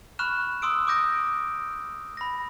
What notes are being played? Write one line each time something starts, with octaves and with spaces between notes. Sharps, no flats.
B5 C#6 F6 F#6 E7
C6 D#6 E6 D7
D6 D#6 G6 A#6 D7
B5 A#6